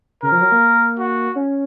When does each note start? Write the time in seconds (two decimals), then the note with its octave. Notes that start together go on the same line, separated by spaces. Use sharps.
0.23 C#3 A#4
0.32 F3
0.41 F#3
0.52 A#3
0.99 F#4
1.36 C#4